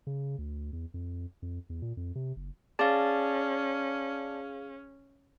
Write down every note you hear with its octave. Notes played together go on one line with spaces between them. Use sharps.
C#3
D2
E2
F2
F2
E2
A#2
F2
C3
F#1
C#4 G#4 D5 F5 A5